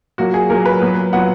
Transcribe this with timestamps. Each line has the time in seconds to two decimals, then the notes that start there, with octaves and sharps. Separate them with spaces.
0.18 A#2 F#3 A#3 F#4
0.34 G#4
0.49 A#2 F#3 A#3 A#4
0.65 B4
0.82 A#2 F#3 B3
1.13 A#2 F#3 B3 F#5